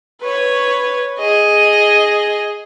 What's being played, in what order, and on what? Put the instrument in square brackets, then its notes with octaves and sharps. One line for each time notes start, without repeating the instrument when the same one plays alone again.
[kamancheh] B4 C#5
G#4 D#5